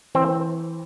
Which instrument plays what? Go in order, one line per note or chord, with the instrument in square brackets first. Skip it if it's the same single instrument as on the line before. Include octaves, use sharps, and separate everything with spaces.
[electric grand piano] E3 [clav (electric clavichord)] C4